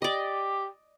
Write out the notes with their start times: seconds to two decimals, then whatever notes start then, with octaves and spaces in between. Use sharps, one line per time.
0.02 G4 D5 D#5